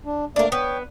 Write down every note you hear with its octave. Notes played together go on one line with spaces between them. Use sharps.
D4
A3 A#3 D4 A#4 D5
B3 C#5 G5